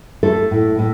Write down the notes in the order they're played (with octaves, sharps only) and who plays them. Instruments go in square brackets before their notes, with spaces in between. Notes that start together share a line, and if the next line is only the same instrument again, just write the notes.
[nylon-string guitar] A3 A4
A2
A2